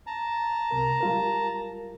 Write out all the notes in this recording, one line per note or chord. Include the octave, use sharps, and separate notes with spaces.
A5 A#5
C2 C3 A#4
G3 F4 A#4